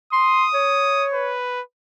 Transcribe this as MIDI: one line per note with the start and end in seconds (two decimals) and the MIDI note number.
0.13 0.45 84
0.13 1.08 87
0.54 1.35 73
1.13 1.62 71